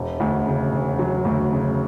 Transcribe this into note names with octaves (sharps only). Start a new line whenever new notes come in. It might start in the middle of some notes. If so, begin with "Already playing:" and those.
Already playing: E1
D2
C#3
E1
F#3
D2
C#3